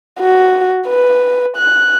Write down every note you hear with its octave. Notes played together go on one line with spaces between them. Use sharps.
F#4
B4
F#6